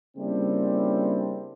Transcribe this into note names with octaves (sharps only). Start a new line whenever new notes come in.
C#3 G3 A#3 C4 D4 E4